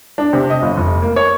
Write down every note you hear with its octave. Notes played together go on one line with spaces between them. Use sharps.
D4
C3
D#5
G1
F1
A#3
C#5